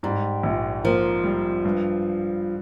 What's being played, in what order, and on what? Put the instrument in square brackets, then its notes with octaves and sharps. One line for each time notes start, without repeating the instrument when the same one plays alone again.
[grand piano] G#2 [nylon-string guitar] G3
[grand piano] A#1
[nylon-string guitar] F3 [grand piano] A#3
[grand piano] G3
G2